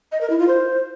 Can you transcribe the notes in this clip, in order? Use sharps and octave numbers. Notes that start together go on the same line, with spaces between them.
D#5
A#4
E4
F4
C5